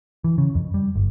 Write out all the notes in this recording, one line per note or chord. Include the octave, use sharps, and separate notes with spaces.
E3
C#3
F2
G3
G1